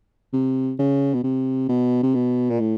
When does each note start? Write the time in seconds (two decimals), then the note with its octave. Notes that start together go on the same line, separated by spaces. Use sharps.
0.33 C3
0.79 C#3
1.14 B2
1.24 C3
1.69 B2
2.03 C3
2.15 B2
2.50 A#2
2.60 A2